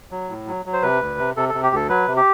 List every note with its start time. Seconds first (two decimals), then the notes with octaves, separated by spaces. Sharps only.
0.11 F#3
0.29 A2
0.47 F#3
0.66 F#3
0.73 C5
0.82 C3 B4
1.01 D2
1.19 C3
1.36 C3 A4
1.49 A4
1.54 C3
1.63 G4
1.71 D2 A4
1.89 F#3 B4
2.08 C3
2.16 G4